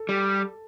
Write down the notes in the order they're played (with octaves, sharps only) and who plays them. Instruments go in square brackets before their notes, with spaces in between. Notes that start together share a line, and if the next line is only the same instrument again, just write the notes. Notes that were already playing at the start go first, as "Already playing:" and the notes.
Already playing: [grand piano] A4
[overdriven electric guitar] G3